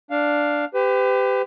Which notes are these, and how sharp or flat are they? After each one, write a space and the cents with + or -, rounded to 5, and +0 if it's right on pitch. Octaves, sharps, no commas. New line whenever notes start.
D4 +0 F5 +0
G4 +10 B4 +40